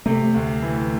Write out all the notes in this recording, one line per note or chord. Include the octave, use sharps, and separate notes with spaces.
C3 A3
D2
E3